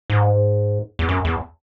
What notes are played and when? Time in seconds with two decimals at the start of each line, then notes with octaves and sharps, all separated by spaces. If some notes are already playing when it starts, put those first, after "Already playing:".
0.10 G#2
0.99 E2
1.09 F#2
1.25 E2